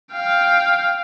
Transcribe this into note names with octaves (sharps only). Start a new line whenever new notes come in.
F5 G5